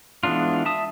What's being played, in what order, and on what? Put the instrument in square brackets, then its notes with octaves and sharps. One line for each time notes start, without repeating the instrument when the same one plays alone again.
[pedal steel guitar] E3 G#3 B3 D4 F4
E5 A5 D#6